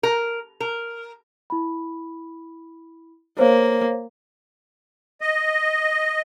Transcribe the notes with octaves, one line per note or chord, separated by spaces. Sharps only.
A#4
A#4
E4 B5
A#3 C5 C#5 F5
D#5